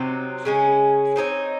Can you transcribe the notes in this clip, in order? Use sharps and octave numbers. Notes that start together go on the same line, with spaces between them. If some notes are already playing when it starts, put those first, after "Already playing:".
Already playing: C3 F#3 C4 D#4
C#3 G#3 C#4
C4 D#4 G#4 C#5